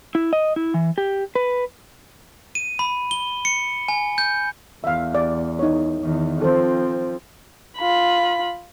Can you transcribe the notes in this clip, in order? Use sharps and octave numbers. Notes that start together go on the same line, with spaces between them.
E4
D#5
E4
E3
G4
B4
D#7
B5
G7
C#7
G#5
G6
E2 E5 F5
D5
D#4 C#5
E2 D#3
F3 C4 A4 C5
F4 B5